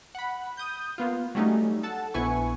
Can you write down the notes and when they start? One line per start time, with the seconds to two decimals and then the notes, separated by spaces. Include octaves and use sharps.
0.15 F#5 B5
0.57 D#6 G6
0.98 A#3 B3 F4
1.35 F#3 G3 A3 C#4 D#4
1.83 A4 F#5 A5
2.14 A#1 B3 E4 B4 G#5 C#6